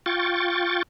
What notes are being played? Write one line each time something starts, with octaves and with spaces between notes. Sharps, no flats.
F4 G5 C#6 A6